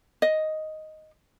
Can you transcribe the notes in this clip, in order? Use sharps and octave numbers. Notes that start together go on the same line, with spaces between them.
D#5